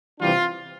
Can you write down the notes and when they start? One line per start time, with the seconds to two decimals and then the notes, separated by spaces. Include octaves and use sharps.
0.19 C3 E3 G3 D4 F4